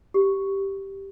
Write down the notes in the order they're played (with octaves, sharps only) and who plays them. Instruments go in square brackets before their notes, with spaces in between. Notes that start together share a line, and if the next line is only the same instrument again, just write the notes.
[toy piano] G4